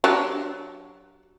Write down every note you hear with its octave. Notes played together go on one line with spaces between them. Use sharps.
F#3 D4 G4